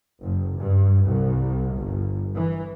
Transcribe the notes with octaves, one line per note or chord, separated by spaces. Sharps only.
F#1
G2
C2
G1
E3